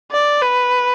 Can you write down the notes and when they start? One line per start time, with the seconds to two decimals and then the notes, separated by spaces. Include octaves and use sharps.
0.11 D5
0.42 B4